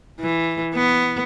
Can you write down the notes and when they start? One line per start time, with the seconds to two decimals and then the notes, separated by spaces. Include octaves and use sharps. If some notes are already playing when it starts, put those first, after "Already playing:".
0.20 E3
0.75 B3